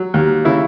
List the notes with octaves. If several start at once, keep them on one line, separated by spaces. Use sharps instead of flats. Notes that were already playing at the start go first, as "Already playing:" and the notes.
Already playing: F#3
D#2
C#3 E4